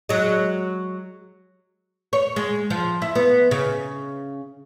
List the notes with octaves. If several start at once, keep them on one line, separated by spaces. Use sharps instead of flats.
F#3 G#3
C#5
G#3
F3
E4
B3
C#3